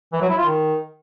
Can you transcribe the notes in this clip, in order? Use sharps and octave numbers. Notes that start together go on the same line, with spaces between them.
E3
F#3
E4
F4
D#3